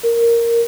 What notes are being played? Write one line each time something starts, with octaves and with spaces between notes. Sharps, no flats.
A#4